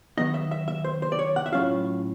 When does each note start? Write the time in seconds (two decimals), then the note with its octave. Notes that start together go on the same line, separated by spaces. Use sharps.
0.17 D#3 F#3 B3 D#4 D#5
0.34 E5
0.51 E5
0.68 E5
0.84 C5
1.02 C5
1.12 D5
1.19 C#5
1.36 F#5
1.46 E5
1.52 A2 F#3 A3 C#4 F4 F5